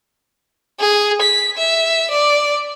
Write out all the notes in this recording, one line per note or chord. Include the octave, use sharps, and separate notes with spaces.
G#4
B6
E5
D5